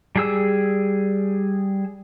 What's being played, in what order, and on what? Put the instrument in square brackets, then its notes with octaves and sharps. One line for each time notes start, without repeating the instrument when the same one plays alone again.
[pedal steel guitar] G3 G#4 E6